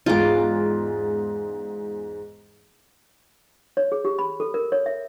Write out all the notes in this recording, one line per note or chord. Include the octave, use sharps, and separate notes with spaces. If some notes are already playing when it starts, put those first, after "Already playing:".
E2 G#2 F4 G#4 D6
C#5
G#4
G4
B5
A4
A#4
C#5
E5